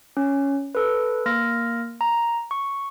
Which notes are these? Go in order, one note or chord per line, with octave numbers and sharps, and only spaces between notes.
C#4
A4 B4
A#3 F6 A#6
A#5
C#6